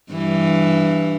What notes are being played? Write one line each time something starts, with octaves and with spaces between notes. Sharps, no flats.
G2 E3